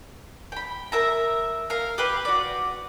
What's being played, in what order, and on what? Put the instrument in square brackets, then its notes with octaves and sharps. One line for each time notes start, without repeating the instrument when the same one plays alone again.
[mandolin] G5 B5
A#4 E5 A#5
A#4 F5
G4 B4 F5
F#4 D5